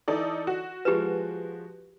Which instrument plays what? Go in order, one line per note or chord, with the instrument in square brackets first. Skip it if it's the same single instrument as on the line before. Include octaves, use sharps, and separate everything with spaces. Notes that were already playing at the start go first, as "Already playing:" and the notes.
[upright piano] E3 [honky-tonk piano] D#4 A4 D5
[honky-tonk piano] F#4
[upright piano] F3 G#3 E7 [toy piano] G4 B4